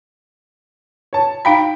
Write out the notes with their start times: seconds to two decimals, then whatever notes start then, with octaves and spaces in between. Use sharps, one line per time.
1.13 C#5 A5
1.45 D#4 F5 G5 A#5 B5 B6